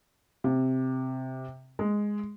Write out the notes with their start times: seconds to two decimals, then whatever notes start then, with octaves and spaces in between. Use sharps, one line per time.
0.44 C3
1.79 G#3